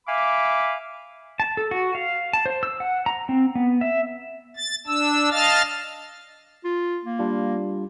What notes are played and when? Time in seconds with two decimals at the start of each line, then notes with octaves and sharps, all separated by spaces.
0.08 E5 F5 G#5 B5 D6
1.40 A5
1.57 A4
1.71 F#4
1.95 F5
2.33 A5
2.46 C5
2.63 E6
2.80 F#5
3.06 A#5
3.29 C4
3.55 B3
3.81 E5
4.56 A6
4.87 D4 E6
5.31 D#5 F5 A5 F6 A6
6.64 F4
7.04 A#3
7.19 G3 D4 F4